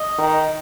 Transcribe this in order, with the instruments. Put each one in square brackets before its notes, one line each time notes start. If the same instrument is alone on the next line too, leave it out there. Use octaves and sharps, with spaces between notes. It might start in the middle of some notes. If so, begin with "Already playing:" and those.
Already playing: [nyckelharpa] D#5
[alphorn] D#3